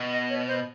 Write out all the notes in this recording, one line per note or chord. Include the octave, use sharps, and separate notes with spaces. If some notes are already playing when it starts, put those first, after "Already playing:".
Already playing: B2
D#5
C#5
C5